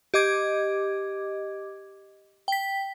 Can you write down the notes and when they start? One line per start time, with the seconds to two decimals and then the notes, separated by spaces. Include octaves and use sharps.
0.14 G4 D#5 D6 G#6
2.48 G5 B6